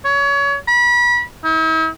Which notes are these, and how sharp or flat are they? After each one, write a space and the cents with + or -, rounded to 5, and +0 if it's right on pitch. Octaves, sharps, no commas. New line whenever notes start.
C#5 +30
B5 -30
E4 -45